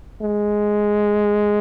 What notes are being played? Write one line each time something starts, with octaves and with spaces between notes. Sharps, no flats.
G#3